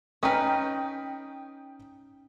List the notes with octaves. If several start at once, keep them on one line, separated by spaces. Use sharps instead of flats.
C#4 D#4 B4 G5 D#6 F6